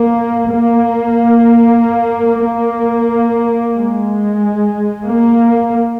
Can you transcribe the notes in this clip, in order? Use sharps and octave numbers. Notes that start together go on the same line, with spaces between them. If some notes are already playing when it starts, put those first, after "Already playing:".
Already playing: A#3
A#3
A#3
G#3
A#3